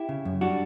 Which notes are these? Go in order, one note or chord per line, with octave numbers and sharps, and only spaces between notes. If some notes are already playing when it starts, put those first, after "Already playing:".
Already playing: E4 G4
C#3
F#2
G3 D4 F#4